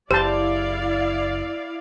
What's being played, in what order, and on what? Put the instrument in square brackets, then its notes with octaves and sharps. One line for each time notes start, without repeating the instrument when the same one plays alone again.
[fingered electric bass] F#1 [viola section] E4 D5 F5 [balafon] G4 [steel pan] C5 A5